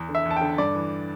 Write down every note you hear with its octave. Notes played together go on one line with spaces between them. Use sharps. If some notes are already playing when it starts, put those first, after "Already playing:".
Already playing: E2
D3
E5
E2
A5
G5
D3
G2 D5
E3